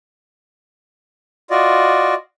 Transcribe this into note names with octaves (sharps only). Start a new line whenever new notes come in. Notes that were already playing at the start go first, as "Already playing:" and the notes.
F4 F#4 D5 D#5